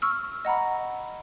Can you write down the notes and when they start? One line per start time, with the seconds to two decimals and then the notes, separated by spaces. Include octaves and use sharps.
0.02 C#6 E6 F6
0.45 D#5 F#5 A#5 B5